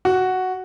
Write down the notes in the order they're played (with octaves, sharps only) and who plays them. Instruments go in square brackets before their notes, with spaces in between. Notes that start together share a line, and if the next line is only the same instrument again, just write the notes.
[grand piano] F#4